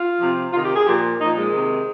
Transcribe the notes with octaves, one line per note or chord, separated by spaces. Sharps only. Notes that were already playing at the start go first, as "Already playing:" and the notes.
Already playing: F4
C3 F3
C3 D#3 F4
G4
G#4
A#2 F3 G4
A#2 F3 D#4
G#3
C3 D#3